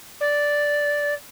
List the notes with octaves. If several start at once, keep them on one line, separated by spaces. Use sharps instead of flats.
D5